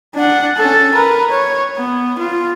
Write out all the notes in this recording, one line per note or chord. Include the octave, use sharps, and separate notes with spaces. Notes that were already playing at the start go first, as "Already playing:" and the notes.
D4 F#5
C#4 A4
A#4 B4
C#5
B3
F4